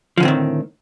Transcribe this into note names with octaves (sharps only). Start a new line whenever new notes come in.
A2 D3 D#3 F3 C4